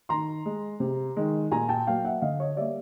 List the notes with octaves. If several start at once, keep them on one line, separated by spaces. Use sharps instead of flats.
D#3 A#5 C6
G#3
C3
D#3 G#3
A#2 G#5 A#5
G5 A5
F#3 A#3 F5 G5
E5 F#5
D3 D#5 F5
C#5 D#5
G3 A#3 D5 E5